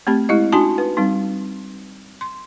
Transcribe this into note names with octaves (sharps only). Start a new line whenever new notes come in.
A3 C4 G4 B5
G#3 E4 G4 D#5
D4 D#4 F#4 G#5 A5 C6
B4
G3 C4 D#4
C6